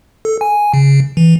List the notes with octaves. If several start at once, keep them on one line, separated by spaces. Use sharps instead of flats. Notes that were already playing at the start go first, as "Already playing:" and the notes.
A4
G#5
C#3
E3